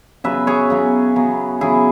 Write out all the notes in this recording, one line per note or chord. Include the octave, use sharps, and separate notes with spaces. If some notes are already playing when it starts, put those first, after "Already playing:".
C#3 F#3 B3 B4 E5
G#4 C#5
C#3 F#3 B3
C#3 F#3 B3
C#3 F#3 B3 E4 G#4